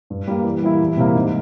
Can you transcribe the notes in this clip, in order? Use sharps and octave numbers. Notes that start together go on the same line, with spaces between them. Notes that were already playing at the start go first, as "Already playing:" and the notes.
G2
G3 A#3
E3
G3 A#3 E4
E2
C3 G3 A#3 E4
G#2